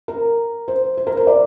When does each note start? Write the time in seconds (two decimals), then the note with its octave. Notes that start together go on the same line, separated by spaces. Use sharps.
0.08 A#4
0.68 C5
0.97 C5
1.07 A#4
1.17 C5
1.27 D5